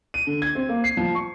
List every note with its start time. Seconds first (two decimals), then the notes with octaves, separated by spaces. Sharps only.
0.14 D#7
0.27 D3
0.42 G#6
0.55 C4
0.69 A#3
0.84 C7
0.97 F3
1.15 C#6